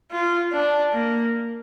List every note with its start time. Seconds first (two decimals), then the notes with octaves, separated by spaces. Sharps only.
0.11 F4
0.52 D4
0.93 A#3